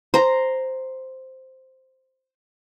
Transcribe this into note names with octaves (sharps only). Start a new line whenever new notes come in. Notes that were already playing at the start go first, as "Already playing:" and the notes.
C5 A#5